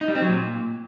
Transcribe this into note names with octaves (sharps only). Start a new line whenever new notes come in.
D#4
G3
C4
F#3
A#2